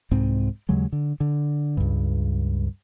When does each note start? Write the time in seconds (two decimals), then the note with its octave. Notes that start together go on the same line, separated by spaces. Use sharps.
0.11 C2 G#2 C4
0.69 D#2 C#3 F#3 G#3
0.92 D3
1.20 D3
1.77 C#2 G2